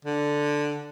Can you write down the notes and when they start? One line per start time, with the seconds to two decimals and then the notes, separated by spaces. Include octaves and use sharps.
0.05 D3